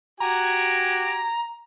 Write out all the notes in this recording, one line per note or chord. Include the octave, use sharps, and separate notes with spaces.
F#4 G4 G#5 A#5